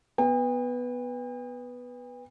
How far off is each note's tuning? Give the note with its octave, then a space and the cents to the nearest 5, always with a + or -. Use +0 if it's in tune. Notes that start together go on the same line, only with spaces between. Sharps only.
B3 +0 G5 +45